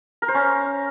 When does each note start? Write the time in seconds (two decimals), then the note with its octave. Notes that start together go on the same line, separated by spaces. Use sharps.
0.22 A#4
0.28 C5
0.35 C#4